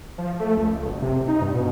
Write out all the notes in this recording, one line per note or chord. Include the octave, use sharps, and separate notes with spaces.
F3
A3
C#2
C#2
F#1
C3
D#4
G2
B2